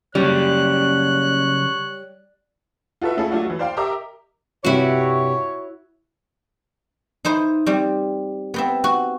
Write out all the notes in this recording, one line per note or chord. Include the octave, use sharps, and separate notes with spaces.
C#3 F#3 G3 C#4 C#5 F#6
F4 F#4 A4 B4 E5
A3 C#4 E4 F4 G#4 A4
F#3 A3 D4 F4 F#4
E3 F#3
C5 D5 F5 G5 C6
G4 A#4 D#5 E5 A#5 D6
G2 C3 E4 F#4 G4 C#5
D#4 E4 C5
G3 C4
B3 C4 E5
F#4